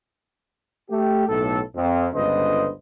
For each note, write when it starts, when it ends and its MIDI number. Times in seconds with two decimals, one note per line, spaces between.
0.91 1.26 57
0.91 1.26 67
1.28 1.60 35
1.28 1.60 45
1.28 1.60 69
1.75 2.08 41
2.14 2.69 31
2.14 2.69 37
2.14 2.69 50
2.14 2.69 71
2.14 2.69 72
2.14 2.69 75